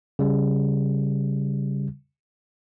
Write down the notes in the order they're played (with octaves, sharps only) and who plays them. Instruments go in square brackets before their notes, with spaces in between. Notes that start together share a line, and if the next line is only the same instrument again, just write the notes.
[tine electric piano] C#3 G3